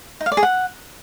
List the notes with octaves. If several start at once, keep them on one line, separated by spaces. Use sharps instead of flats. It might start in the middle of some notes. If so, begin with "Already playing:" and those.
D#4
F5
D5
G#4
F#5